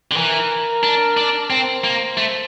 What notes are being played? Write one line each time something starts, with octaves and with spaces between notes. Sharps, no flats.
D3
E3 A#4
D4
D4
C4 C5
A#3
A3